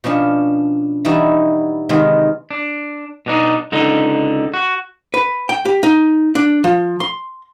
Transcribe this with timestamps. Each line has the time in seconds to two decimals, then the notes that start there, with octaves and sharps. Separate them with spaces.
0.04 B2 F3 C#4 D4
1.05 E3 G3 D#4 E4 F#4
1.89 C3 D#3 G#3 B3
2.51 D4
3.26 B2 D4 D#4
3.72 C#2 D3 D#4
4.54 F#4
5.14 B4
5.49 G5
5.65 G4
5.83 D#4
6.35 D4
6.64 F3
7.00 C6